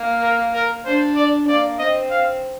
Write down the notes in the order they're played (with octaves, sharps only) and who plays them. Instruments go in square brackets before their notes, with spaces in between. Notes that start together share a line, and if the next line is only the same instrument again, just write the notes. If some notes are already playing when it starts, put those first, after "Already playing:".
Already playing: [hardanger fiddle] A#3
[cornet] A#4
A#4
[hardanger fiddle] D4 [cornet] C5
[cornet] D5
[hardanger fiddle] A#3 [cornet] D5
[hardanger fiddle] C4 [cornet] D#5
[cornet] F5